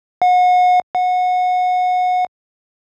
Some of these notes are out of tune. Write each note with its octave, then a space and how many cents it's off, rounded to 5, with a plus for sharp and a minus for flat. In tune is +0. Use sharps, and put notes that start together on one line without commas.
F#5 -35
F#5 -25